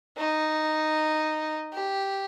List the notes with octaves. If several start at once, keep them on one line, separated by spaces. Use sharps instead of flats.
D#4
G4